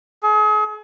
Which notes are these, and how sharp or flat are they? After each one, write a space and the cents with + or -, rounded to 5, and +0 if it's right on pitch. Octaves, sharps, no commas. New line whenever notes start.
G#4 +40